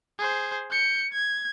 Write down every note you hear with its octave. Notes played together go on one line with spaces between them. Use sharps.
G#4 C5
G6 C#7
G#6